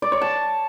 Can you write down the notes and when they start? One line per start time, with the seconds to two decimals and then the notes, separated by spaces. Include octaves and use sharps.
0.02 D5
0.12 C#5
0.21 A5